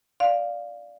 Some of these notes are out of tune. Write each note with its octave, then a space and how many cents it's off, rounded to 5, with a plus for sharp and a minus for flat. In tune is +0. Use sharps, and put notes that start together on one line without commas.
D5 +0 F5 +0